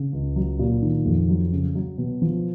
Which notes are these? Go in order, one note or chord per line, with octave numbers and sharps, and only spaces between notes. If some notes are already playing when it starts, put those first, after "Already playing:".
Already playing: C#3
C#2
F#3
A#2
D#3
F2
F#3
C#3
F#3
B2
F3